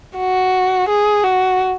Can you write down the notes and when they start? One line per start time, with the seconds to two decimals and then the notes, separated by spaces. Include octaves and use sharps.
0.17 F#4
0.89 G#4
1.24 F#4